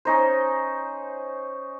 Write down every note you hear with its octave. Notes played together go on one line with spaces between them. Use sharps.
C#4 D#4 C5